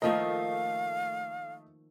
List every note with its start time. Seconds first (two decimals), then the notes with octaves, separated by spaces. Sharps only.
0.02 D#3 F3 A3 A#3 D#5 F5